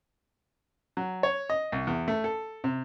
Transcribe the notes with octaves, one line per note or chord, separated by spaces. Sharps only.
F#3
C#5
D#5
C2
E2
A3
A4
C3